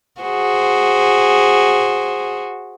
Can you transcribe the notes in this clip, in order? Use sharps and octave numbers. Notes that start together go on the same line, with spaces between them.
F#4 G#4 C5